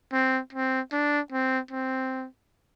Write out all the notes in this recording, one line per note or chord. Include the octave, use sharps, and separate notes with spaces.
C4
C4
D4
C4
C4